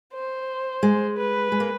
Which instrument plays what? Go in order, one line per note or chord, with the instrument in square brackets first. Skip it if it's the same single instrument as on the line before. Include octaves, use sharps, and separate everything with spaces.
[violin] C5
[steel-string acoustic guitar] G#3
[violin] B4
[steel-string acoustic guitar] G#3
A#3